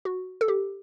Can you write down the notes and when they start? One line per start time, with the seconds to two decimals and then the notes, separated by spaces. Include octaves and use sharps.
0.05 F#4
0.41 A4
0.48 G4